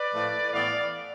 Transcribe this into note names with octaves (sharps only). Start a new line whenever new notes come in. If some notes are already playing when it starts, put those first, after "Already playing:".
Already playing: B4 D5
A2 F3 A3
A2 E3 B3 D5 F5